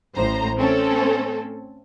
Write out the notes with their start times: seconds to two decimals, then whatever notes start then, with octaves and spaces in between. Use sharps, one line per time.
0.15 A1 A2 C5 A#5
0.58 A3 C4 C#4 A4